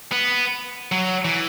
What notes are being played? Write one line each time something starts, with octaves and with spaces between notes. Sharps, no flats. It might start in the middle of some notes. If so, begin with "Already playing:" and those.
B3
F#3
E3